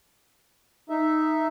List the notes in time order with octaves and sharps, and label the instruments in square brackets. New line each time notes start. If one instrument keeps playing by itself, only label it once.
[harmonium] D#4 E5